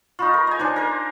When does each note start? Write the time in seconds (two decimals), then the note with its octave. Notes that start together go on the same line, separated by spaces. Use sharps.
0.19 D#4 F4 B5 C#6
0.34 A#4
0.47 D#5 G#5
0.59 D4 D#4 C5 C#5 G#5
0.76 A#4 C5